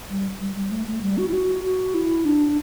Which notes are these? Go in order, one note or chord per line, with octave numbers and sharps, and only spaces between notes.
G3
G3
G3
A3
A3
G3
F#4
E4
F#4
F#4
E4
D4